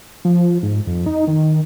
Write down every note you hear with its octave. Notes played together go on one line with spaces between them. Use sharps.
F3
G#2
F2
D#4
D#3